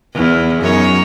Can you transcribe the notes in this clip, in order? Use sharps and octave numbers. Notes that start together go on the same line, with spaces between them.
E2 E4
F#2 D#4 C#5